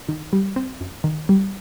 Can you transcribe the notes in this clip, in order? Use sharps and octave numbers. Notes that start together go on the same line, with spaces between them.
D#3
G3
C4
F#2
D#3
G3